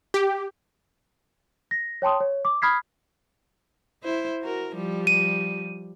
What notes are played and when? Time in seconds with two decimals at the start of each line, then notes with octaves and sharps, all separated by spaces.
0.14 G4
1.71 A#6
2.02 C#5 G5 A5 C6 D#6
2.20 C#5
2.45 D6
2.62 B5 D#6 F6 G#6 B6 C7
4.03 E4 C5
4.41 F#4 A#4
4.73 F3 G3
5.07 D#7